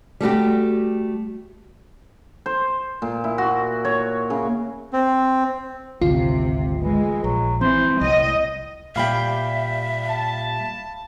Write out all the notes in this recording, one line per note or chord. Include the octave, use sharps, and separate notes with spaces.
G3 A3 F#4 G4
C5
A#2
E4
F#4
C#5
C#3
C4
G#1 D2 C3 F4
E3 G#3
A#1 F#3
E3 C4 C5
C2 A2 D#5
A#2 G3 E5 F5 G5 B5
A5